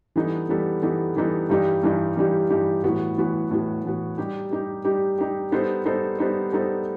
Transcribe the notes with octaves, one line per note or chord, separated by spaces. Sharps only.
E3 G3 B3 D#4 A4
E3 G3 B3 D#4 A4
E3 G3 B3 D#4 A4
E3 G3 B3 D#4 A4
G2 E3 G3 D#4 G4
G2 E3 G3 D#4 G4
G2 E3 G3 D#4 G4
G2 E3 G3 D#4 G4
A2 E3 B3 F#4
A2 E3 B3 F#4
A2 E3 B3 F#4
A2 E3 B3 F#4
G3 D#4 G4
G3 D#4 G4
G3 D#4 G4
G3 D#4 G4
G3 B3 D#4 A4 C5
G3 B3 D#4 A4 C5
G3 B3 D#4 A4 C5
G3 B3 D#4 A4 C5